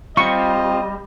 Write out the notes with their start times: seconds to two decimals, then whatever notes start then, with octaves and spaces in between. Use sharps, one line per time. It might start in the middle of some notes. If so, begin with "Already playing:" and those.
0.17 G3 C4 F4 D#5 C#6